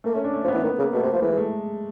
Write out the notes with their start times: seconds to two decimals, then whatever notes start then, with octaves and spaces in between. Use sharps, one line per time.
0.04 A3 A#3
0.14 A3 C#4
0.24 D4
0.34 A3
0.44 F3
0.48 B3
0.54 E3
0.63 D#3 B3
0.78 C#3 A#3
0.93 B2 A3
1.03 C3
1.13 F3
1.22 E3 G#3
1.33 G#3
1.37 A3